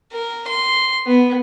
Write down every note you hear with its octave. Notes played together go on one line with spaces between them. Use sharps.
A#4
C6
B3